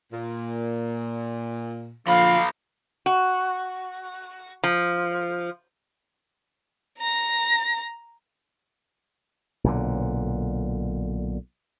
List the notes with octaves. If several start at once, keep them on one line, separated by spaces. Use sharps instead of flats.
A#2
B1 A#2 D3 F3 F5 B5
F#4
F3
A#5 A#6
B1 A#2 D3